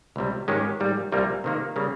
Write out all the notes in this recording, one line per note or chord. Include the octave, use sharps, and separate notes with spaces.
C#2 C3 G3
G#2 D#3 G#3 C#4 G4
G#2 G3 A#3
C2 A#2 G3 A#3
C3 D#3 A#3
C#3 G3 A#3